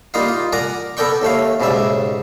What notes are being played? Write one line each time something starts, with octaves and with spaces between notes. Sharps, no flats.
G3 A#3 D#4 F4 F5
F4
A#4 D5 F#5 G#5 A#5
B3 A4 A#4 D5 G5 C#6
D#2 A3 C#5 F5
B1 G#2 C#3 G3 E5